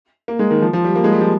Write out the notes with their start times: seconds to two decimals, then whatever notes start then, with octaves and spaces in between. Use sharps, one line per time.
0.28 A#3
0.39 G#3
0.51 D#3
0.62 F3
0.73 F3
0.84 G3
0.96 A#3
1.04 G#3
1.13 G3
1.21 F3